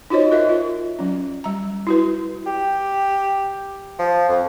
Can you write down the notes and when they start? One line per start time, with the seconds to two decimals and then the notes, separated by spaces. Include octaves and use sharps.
0.10 D#4 F4 F#4 C5 C#5 D#5
0.31 F4 A#4 D#5 E5
0.49 F4
0.99 F#3 C#4
1.44 G3 A#5
1.87 E4 F#4 B4
2.46 G4
3.99 F3
4.29 F2